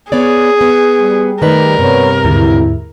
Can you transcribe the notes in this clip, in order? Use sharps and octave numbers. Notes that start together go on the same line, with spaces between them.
B3 G#4 C#5 D5
B3
G3
D#3 A3 A#4 B4 D5
G2 C3 B3 B4 C#5
D#2 G#2 D3 E4